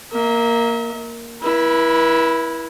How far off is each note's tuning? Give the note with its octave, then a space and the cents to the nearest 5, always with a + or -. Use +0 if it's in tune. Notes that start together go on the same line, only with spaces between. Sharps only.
A#3 +0 E5 -40
E4 +0 B4 -40